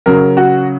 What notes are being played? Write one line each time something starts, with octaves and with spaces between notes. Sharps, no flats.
C#3 F#3 A#4
F#4